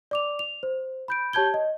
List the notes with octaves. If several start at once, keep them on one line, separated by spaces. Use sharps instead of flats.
D5 D6 F7
F7
C5
B5 G6 D7
G4 C#5 A5 G6 G#6 G7
D#5